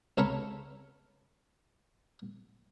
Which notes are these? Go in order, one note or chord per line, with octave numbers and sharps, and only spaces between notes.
C#2 A4 A#4 C#5 B5 C#6